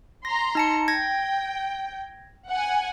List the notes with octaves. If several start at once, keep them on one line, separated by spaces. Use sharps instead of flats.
A#5 C6 A#6
D#4 A5 C#7
G5 G#6 A#6
F#5 G#5